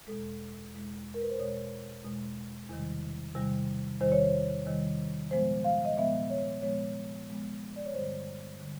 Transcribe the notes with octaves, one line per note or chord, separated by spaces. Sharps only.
E2 B2 G#3 A4
E2 B2 G#3
A#4
B4
C5
E2 B2 G#3 C#5
E2 B2 G#3
E2 C3 D#3 G3
E2 C3 D#3 G3
E2 C3 D#3 G3 C5
C#5
C5
E2 C3 D#3 G3
A#2 F3 G#3 B3 C5
F5
D#5
A#2 F3 G#3 B3 E5
C#5
A#2 F3 G#3 B3 C#5
A#2 F3 G#3 B3
D5
C#5
G2 D3 G3 C5
D3 G3